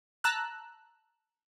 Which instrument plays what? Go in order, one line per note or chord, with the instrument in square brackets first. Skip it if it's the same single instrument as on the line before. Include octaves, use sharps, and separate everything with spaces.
[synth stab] A5 A#5 E6 F#6